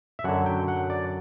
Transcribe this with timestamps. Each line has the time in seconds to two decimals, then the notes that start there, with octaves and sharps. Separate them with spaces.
0.19 E5
0.24 F#2 D3 F#3 F#5
0.46 G5
0.68 F#5
0.90 D5